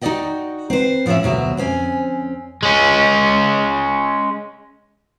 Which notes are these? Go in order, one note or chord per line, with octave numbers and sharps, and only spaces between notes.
D#4 F#4 A4 D5 D#5 G5
C4 B4 C5
A2 F3 C4 C#4 G#4 E5
D2 B2 F#3 D5 E5
F2 C4 C#4 G#5
G#3 C#4